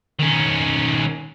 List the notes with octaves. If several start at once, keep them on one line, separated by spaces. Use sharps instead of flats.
D#3 C#4